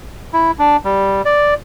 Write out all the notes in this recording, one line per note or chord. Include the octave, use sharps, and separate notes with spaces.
E4
D4
G3
D5